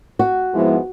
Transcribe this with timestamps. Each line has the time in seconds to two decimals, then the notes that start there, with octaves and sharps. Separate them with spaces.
0.19 F#4
0.53 G#2 F3 G#3 B3 E4